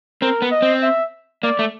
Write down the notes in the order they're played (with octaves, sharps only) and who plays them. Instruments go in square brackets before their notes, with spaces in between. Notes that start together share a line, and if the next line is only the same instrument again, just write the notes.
[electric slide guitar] C4 [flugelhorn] A#4
[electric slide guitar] B3
[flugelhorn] D#5
[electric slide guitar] C4
[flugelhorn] E5
[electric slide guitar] A#3 [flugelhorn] D5
[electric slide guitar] A3